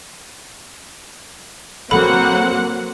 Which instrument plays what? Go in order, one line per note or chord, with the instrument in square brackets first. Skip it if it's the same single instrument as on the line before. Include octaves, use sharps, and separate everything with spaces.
[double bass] F#3 [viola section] A#3 C4 F#5 [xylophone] A4 B5